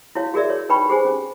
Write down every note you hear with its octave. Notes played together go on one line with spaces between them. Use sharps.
E4 F#4 C#5 F5
F#4 G#4 A#4 D5 E5
C#5
D#4 B4 G5 B5 C#6
G4 G#4 C5 G#5
C#4